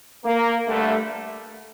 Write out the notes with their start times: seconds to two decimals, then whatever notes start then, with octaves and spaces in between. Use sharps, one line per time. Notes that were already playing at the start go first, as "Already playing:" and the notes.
0.25 A#3
0.67 G2 D3 G3 A3